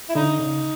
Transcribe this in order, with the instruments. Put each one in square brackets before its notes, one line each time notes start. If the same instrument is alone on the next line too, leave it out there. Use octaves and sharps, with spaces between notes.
[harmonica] E4
[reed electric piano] D3 [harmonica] D#4
[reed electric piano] C#3